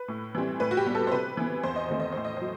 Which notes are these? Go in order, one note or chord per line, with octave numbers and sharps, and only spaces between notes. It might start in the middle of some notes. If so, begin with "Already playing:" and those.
Already playing: B4
A2
E3 G3 C4
A2 B4
F#4
G4
G3 B3
A4
C5
C3 B4
E3 B3
E2 C5
D#5
D#3 A3 C4 C5
D#5
A2 C5
D#5
F#3 C5